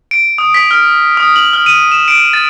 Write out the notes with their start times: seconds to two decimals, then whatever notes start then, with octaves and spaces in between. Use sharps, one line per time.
0.11 D7
0.38 D#6
0.54 B6
0.71 F6
1.17 D#6
1.36 F#7
1.53 F6
1.66 D#7
1.92 E7
2.08 D7
2.33 A6